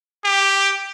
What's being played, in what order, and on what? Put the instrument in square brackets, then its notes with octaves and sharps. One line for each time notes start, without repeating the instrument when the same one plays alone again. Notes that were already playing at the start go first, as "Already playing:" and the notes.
[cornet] G4